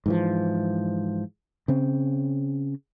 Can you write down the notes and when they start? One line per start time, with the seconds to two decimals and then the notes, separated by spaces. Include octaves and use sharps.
0.06 G#2 E3 F3
1.68 C#3 C4